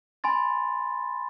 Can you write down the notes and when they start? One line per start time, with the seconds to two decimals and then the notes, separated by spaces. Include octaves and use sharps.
0.24 G#5 B5 C6 A6